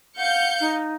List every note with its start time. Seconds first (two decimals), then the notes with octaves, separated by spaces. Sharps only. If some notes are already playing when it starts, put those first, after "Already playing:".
0.17 F5 F#5 G6 C#7
0.60 D#4